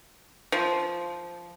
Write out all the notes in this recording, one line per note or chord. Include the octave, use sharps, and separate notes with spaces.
F3